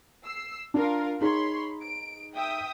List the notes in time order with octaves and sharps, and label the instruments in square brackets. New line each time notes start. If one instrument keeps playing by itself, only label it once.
[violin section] E6 C7
[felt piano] D4 [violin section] F4 A#4 F5
[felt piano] D#4 G#4 [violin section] C#5 B5 C6
[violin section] D7
E5 G5 D#6